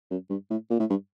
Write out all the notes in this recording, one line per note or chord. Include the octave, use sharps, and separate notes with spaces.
F#2
G2
A2
A#2
A2
G2